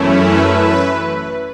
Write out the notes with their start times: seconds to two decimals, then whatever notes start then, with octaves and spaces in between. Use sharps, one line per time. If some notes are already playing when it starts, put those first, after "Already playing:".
Already playing: F#2 E3 A3 C#4 E4
0.16 B4 E5
0.47 B4